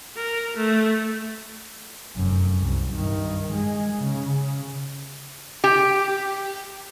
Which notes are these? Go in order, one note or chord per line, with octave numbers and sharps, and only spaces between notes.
A#4
A3
F1 F#2
C2
G2 D#3
G#3
C#3
G4